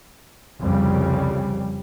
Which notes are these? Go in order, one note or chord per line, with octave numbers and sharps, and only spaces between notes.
C2 F2 C#3 G3